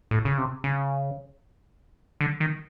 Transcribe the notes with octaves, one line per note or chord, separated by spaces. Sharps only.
A2
C#3
C3
C#3
D3
D#3